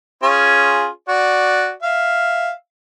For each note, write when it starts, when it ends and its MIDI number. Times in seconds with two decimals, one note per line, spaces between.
0.23 0.88 61
0.23 0.88 65
0.23 0.88 68
1.08 1.71 66
1.08 1.71 74
1.82 2.52 76
1.82 2.52 77